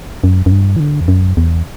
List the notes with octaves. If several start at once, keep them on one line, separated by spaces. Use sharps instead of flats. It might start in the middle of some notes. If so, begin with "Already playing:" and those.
F#2
F#2
G2
E3
D3
E2
F#2
E2